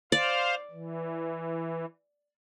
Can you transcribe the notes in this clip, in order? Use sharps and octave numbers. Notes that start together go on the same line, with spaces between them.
C5 D5 F5
E3